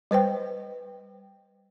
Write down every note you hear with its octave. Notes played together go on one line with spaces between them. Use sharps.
G3 B4 C5 G5